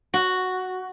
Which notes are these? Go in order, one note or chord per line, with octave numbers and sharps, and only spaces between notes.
F#4